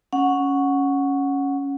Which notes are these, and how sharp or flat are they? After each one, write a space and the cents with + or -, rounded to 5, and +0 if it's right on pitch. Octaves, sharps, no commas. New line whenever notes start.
C#4 +0 F#5 -10